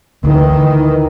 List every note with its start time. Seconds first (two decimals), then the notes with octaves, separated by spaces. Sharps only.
0.24 D2 D#3 E3